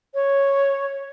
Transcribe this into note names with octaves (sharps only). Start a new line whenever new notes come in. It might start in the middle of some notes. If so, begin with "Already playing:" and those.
C#5